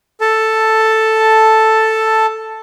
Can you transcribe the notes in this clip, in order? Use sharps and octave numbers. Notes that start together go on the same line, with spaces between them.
A4 A5